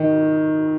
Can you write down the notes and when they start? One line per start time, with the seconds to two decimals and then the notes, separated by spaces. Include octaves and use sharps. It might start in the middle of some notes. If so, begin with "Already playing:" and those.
Already playing: D#3